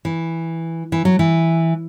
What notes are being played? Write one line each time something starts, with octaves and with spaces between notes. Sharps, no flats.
E3
E3
F#3
E3